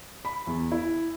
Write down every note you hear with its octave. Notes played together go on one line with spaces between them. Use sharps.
B5
E2
E4